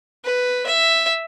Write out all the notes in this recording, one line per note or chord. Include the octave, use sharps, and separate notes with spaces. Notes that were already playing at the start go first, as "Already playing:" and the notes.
B4
E5